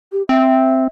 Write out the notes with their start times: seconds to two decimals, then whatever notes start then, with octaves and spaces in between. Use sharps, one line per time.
0.12 G4
0.29 C4 E5